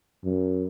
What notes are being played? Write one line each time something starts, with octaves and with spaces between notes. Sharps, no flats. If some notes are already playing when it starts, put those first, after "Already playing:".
F#2